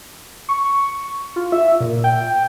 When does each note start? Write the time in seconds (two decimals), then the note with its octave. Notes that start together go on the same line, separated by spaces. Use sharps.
0.49 C#6
1.36 F4
1.52 E5
1.80 A#2
2.04 G5